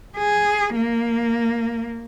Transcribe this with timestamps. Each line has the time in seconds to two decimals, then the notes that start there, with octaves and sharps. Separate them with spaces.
0.18 G#4
0.76 A#3